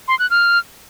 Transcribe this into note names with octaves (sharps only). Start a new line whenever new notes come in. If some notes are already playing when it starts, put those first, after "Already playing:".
C6
F#6
F6